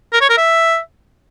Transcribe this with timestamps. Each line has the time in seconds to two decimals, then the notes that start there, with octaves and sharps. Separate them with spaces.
0.13 A#4
0.21 C#5
0.29 A#4
0.37 E5